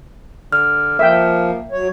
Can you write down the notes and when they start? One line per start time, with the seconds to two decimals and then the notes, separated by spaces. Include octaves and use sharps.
0.52 D3 F6
0.99 F3 A#3 E5 G5
1.72 F#3 C#5